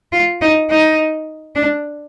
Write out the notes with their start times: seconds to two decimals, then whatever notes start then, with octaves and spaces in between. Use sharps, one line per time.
0.12 F4
0.41 D#4
0.70 D#4
1.55 D4